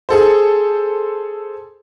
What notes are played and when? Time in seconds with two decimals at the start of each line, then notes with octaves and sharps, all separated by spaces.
0.09 G#4 A4 C5